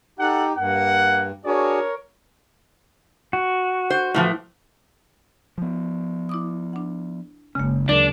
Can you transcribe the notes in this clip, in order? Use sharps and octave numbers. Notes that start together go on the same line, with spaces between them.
D#4 G4 A4 F#5
G2 A#3 F#5
D4 F#4 G#4 A#4 C#5
F#4
C5
A2 E3 F3
F3 B3
E4 D6 D#6
D4 F#5
F#1 C#3 G#3 A#3 C#4
D2 E3 F#3 D4 G#4 A#4 D6